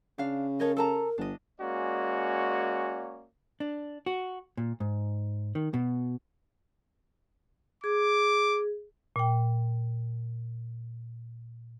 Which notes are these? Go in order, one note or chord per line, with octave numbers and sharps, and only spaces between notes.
C#3 D4 F5
A4 A#4 C#5 D#5
A4 A#4 A5 A#5
G1 D4 D#5
G#3 A#3 C#4 F#4 D5
D4
F#4
A#2
G#2
D#3
B2
G#4 D6
A#2 G5